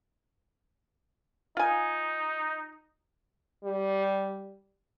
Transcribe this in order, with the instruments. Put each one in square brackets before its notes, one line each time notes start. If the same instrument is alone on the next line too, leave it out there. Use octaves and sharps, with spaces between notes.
[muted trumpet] D#4 [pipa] F4 G#5
[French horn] G3